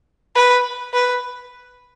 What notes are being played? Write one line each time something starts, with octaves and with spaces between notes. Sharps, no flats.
B4
B4